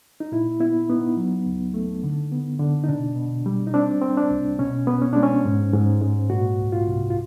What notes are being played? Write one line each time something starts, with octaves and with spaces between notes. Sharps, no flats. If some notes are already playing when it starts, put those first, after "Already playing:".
D#4
A#2 E4
B3 E4
B3 D#4
F#3
C#2
A3
D3
B3
D3
D#4
B2 D4
B2
G3
D#4
C4 D4
C4
D4
C2
B2 C#4
B3
C#4
G#3 D4
C#4
G#2
G#2
G#2
A#2 F#4
C2
F4
C2
F4